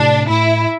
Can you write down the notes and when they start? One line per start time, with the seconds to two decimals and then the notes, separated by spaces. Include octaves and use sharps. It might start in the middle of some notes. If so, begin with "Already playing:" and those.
Already playing: A2 C3 D4
0.29 A2 E4